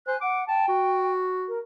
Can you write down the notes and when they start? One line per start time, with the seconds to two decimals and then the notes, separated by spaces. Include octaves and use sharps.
0.08 C5 G#5 F#6
0.21 F#5 D6
0.48 G5 A5
0.68 F#4
1.48 A#4